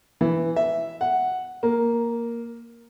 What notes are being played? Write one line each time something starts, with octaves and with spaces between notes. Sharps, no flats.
E3
E5
F#5
A#3